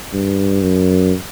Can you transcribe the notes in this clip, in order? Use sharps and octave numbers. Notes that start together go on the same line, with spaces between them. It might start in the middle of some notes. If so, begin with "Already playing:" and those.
G2
F#2